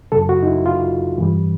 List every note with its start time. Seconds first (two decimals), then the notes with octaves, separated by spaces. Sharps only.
0.12 F#2 C#3 F#3 A4
0.29 F#4
0.43 D#4
0.47 E4
0.66 F4
1.18 G2 E3 G3